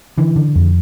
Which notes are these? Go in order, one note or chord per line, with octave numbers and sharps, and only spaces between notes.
D3 E3
D3
F2